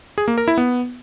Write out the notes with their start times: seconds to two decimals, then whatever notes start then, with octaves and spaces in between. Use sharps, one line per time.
0.18 G#4
0.28 A#3
0.38 A#4
0.48 E4
0.57 B3